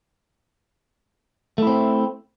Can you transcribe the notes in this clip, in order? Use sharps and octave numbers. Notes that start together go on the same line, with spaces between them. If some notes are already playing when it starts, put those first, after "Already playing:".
A3 C4 E4